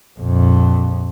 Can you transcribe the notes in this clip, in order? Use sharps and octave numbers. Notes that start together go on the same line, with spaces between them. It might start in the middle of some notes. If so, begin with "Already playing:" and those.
A#1 F2